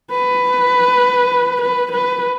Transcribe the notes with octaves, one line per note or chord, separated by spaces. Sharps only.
B4
B4
B4